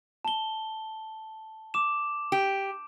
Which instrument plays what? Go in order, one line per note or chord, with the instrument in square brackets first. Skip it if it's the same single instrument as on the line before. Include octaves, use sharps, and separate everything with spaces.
[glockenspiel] A5 G7
D6 E7
[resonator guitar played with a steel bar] G4